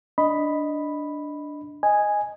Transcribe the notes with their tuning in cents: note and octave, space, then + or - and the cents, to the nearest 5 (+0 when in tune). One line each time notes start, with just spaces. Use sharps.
D4 +0 D#5 +5 B5 +0
D#5 +0 G#5 -5